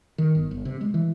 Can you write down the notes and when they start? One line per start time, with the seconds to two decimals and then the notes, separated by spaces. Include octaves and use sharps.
0.18 D#3
0.35 G1
0.51 G1
0.65 C3
0.81 G#3
0.94 E3